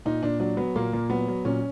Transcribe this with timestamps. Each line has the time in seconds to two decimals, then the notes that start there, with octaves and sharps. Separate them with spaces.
0.05 A#2 D#4
0.23 A#2 D4
0.40 F#3 D4
0.57 F#3 B3
0.76 A#2 A#3
0.93 A#2
1.10 F#3 B3
1.28 F#3
1.45 A#2 C#4